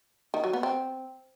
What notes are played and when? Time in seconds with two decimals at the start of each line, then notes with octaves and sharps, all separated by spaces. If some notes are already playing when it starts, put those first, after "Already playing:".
0.34 D#3
0.44 F#3
0.53 B3
0.63 C4